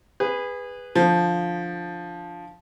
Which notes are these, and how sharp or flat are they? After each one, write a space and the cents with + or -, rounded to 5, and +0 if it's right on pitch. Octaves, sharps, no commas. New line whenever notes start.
G#4 -25 B4 +0
D3 +15 F3 +0